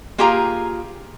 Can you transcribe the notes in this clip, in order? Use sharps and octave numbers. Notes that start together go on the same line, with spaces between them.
A#3 F4 G4 G#4 F5 A#5